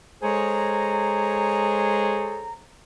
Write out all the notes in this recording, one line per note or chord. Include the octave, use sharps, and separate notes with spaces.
G#3 G#4 A4 C5 C#5 A#5